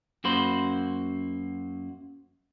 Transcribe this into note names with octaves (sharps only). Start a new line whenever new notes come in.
F#2 A#3 F#4 C5 B5